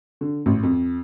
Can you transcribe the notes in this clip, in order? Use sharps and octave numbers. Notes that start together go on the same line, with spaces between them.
D3
A1
F2